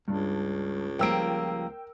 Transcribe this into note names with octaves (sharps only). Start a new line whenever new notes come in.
C#2 G2 D4
F3 G3 A#3 A#4 G5 E6 D7